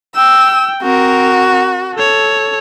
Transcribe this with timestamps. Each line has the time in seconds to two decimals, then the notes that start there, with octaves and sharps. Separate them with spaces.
0.16 G5 E6
0.82 C4 F#4 A#4
1.94 A4 C#5